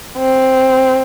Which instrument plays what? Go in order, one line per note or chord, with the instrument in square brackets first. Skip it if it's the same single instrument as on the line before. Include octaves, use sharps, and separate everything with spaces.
[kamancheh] C4